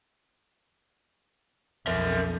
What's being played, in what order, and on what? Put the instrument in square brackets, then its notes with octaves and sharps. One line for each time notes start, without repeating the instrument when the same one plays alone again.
[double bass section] B1 F2 [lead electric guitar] A#4 E5